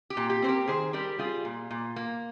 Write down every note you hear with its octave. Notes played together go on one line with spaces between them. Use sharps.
G4
A#2
G4
C4 C5
G4 A#4
D#3 G#4 C5
G3 G4 A#4
G3 F4 G#4
A#2
A#2
A#3